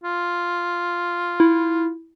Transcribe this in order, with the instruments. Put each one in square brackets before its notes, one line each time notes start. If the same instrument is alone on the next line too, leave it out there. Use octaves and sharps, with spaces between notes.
[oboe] F4
[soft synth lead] E4